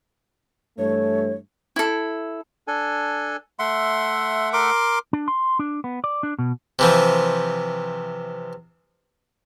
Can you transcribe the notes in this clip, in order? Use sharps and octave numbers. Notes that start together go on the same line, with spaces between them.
G2 E3 A3 C#5
E4 A4
D4 A4 G#5
A3 E5 F#5 C6
A#4 C6 D6
D4
C6
D4
B3
D5
D4
B2
C3 E3 F3